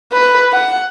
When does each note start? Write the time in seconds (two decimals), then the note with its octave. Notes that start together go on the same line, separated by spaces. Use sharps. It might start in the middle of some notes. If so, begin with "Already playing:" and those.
0.13 B4
0.53 F#5